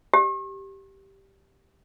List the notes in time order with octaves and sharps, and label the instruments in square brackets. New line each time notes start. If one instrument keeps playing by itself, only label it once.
[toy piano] G4